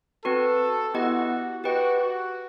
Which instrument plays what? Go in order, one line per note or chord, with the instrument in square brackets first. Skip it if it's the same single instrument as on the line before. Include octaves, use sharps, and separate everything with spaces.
[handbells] C4 F#4 B4 [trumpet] A4
[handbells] B3 E4 G4 D#5 F#5 [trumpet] F#4
[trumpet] F#4 [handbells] G4 B4 D#5 G5
[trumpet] F#4